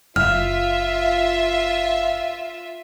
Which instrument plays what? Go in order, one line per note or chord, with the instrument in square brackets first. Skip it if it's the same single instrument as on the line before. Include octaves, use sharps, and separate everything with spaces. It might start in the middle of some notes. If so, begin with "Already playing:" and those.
[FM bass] F#1 [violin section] F4 E5 [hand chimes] F6